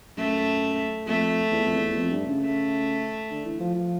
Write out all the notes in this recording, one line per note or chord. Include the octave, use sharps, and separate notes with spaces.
F#2 A3
F2 A3
E2
F2
E2
E2
F2
G2
C#3
A3
D3
E3
F3
F3